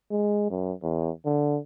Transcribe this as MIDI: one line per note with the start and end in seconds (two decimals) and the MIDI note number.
0.11 0.50 56
0.50 0.72 42
0.83 1.11 40
1.25 1.59 50